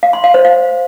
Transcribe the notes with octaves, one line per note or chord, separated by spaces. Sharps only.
F5
C6
F5
C5
F5